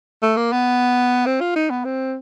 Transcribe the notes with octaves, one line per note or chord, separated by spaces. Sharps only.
A3
A#3
B3
C4
F4
D#4
B3
C4